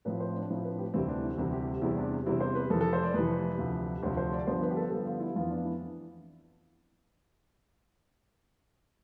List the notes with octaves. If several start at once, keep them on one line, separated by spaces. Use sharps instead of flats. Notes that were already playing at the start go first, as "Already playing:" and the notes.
A2 F3 C4 B4
C5
D4
A2 F3 C4 E4
B4
G4
D2 C3 E3 G3 C4 E4
D4
E4
D2 C3 E3 G3 C4 E4
G4
E2 C3 G3 C4 E4
D4
E2 C3 G3 C4 E4
C5
B4
F2 C3 E3 A4
A4
C5
D5
F2 C3 E3 B4
D2 C3 F3
D2 C3 F3 C5
C5
D5
G2 D3 F3 B3 C5
B4
G4
A4
G2 D3 F3 B3 A4
F4
E4
F2 E3 B3 F4
D4
E4